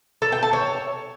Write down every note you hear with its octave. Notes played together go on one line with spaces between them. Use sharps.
A4
G5
A5
C#5